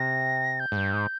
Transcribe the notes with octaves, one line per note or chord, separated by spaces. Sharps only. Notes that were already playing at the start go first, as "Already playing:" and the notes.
Already playing: C3 A#6
G6
G#2
G2
G#2